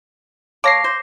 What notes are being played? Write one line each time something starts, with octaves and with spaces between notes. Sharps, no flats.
A#3 A4 C#5 D6 A#6 C7
C5